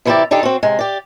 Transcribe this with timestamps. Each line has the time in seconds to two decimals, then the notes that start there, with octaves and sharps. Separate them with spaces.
0.05 C3 E3 E4 F#4 G4 D5
0.31 D3 D4 D#4 G4 A4
0.43 C4 F#4
0.63 C3 G#3
0.79 G4 D5